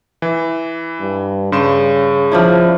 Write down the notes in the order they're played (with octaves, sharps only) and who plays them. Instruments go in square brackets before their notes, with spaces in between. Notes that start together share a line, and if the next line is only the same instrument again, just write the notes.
[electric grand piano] E3
[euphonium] G2
[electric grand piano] G2 C6 E7 [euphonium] C#3
[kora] F3 D4 E4